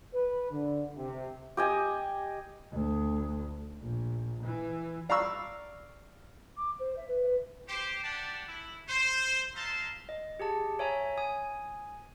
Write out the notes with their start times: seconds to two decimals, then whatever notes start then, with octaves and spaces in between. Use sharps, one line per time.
0.14 B4
0.51 D3
0.97 C3
1.57 G4 D#5 G#5
2.72 D2
3.81 A#1
4.43 E3
5.09 D5 F5 A#5 B5 C#6 E6
6.57 D6
6.80 C5
6.96 E5
7.08 B4
7.68 G4 C5
8.04 D4 G4 F#5 A5
8.47 E4
8.89 C5
9.55 D#4 E5 F5 A5 A#5 C6
10.09 D#5
10.40 G4 G#4 A5
10.79 C#5 E5 G#5 A#5
11.17 G#5 D#6